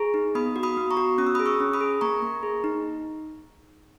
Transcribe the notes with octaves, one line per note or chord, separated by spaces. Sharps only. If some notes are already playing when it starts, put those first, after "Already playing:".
Already playing: G#4 A#5 C#6
D#4
B3 B5 D#6
F#4
B5 D#6
B3
A#5 C#6
F#4
C#4 D#6
E6
G#4 B5 D#6
C#6 E6
C#4
B5 D#6
G#4
A#3 A#5 C#6
A#3
G#4
D#4